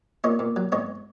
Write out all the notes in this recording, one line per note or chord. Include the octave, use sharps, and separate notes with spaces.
A#2 C#5 D#5
A#2
F#3
G#2 C#5 D#5